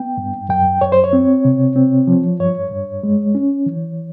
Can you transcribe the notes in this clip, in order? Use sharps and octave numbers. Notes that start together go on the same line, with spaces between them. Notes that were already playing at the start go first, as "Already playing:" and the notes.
Already playing: B3 G5
G2
F#2 G5
F#2 C#5
C5
C#5
C4
C3
C4
F3
G2 C#5
G2
G#3
C#4
E3